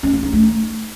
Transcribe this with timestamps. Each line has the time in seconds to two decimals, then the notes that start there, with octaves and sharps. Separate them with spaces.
0.03 C#4
0.13 A#3
0.23 D#4
0.33 A3
0.43 D#4